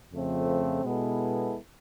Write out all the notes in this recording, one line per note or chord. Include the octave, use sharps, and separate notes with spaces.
F2 C#3 F3 A3 C4
B2 G#3 B3 E4 A4